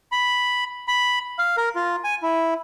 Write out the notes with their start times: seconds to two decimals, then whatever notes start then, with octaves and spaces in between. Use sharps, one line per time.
0.12 B5
0.88 B5
1.39 F5
1.57 A#4
1.75 F4
2.04 G#5
2.22 E4